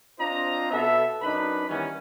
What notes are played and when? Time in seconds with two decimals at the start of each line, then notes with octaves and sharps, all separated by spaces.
0.19 C4 D4 F4 C5 D#5 A#5
0.71 B2 B3 A4 E5
1.22 F#2 D4 D#4 B4 B5
1.69 D#3 E3 G3 B3 C#4